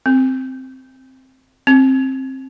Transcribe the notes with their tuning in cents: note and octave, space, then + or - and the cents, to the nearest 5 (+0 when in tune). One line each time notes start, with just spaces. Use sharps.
C4 +0
C4 +20